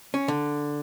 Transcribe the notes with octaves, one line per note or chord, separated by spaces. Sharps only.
C#4
D3